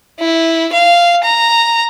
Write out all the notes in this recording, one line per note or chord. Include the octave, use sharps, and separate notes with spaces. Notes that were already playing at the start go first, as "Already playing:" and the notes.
E4
F5
A#5